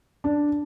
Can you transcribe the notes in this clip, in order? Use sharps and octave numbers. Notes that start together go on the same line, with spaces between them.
D4